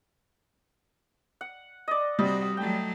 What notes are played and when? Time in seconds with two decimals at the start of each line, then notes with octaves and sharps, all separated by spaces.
1.41 F#5
1.88 D5 D#5
2.19 C3 G3 F#4 D#5
2.57 F#3 A3 G5